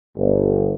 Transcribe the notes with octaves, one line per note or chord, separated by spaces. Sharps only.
G1